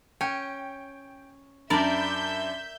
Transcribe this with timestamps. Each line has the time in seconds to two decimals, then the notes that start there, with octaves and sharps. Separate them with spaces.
0.21 C#4 G5
1.70 F#2 D4 A#4 D5 E5 B5 G6